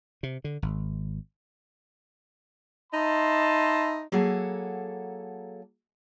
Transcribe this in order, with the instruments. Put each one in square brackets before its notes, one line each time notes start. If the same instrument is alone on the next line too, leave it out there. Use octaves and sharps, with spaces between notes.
[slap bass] C3
D3
G#1
[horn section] D#4 D#5 E5 A5 B5 C6
[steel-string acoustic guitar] F#3 A#3 G#4 A4 F#5